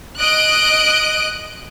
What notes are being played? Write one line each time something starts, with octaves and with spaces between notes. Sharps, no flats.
D#5 F#6 D7